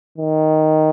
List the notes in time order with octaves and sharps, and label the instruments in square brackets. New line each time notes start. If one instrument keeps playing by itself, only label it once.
[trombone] D#3